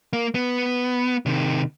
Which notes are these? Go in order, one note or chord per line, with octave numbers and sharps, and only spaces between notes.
A#3
B3
C3 D#3